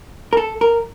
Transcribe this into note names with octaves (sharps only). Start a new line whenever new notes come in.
A#4
A4
A#4